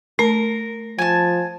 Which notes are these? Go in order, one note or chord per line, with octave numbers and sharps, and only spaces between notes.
A3 A#4
F3 G#5 A5